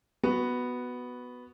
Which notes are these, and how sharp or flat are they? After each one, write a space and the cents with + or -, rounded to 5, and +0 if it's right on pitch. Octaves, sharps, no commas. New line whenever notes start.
B3 +0 F#4 +0